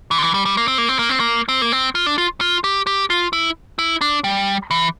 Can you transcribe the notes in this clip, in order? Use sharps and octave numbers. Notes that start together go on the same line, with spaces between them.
E3
D3
E3
G3
G3
A#3
C4
A#3
C4
A#3
C4
A#3
C4
A#3
C4
F4
D4
F4
F4
G4
G4
F4
E4
E4
D4
G3
E3